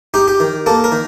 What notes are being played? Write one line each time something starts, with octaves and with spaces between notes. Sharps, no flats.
D#4 G4
G4
D#3
A#3 A4
A#4
D#3